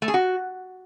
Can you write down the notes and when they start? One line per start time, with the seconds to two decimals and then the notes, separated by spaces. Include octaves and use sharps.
0.02 A3
0.08 G#4
0.14 F#4